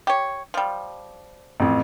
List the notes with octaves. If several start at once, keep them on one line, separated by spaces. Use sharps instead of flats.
G4 C#5
F3 G3
A1 F2